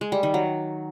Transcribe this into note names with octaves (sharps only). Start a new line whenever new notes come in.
G#3
G3
D#3
F#3